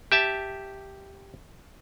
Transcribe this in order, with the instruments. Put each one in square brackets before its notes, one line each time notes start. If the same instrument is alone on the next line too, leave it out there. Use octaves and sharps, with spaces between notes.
[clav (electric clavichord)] G4 E5 A5